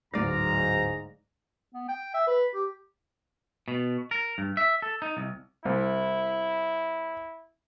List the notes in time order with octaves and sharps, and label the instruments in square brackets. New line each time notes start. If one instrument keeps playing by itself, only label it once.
[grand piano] D1 F#3 A#6 [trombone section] G#2 [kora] D5 F5 [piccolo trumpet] A#5
[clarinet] B3
G5
E5
B4
G4
[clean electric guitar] B2
A#4
G2
E5
A4
D#4
C2
[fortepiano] C2 [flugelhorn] E4